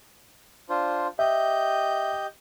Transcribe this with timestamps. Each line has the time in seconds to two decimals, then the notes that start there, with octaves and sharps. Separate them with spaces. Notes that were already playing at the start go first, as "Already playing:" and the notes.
0.69 D4 F4 C5
1.19 G4 D#5 E5 G6